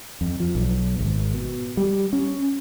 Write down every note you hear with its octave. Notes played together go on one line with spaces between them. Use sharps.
F2
F3
B1
G#1
B2
G3
C#4